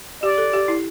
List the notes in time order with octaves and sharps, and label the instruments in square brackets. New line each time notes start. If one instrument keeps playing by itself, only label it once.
[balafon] G4 [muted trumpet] D5
[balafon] A4
G4
E4